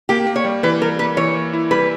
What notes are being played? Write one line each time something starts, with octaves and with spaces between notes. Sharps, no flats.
A#3 G4
A#3
C#5
G3
E3 B4
G3 A#4
A#3 B4
E3 C#5
A#3
E4
G3 B4